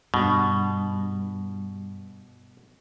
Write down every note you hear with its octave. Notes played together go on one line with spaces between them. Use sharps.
G2 B2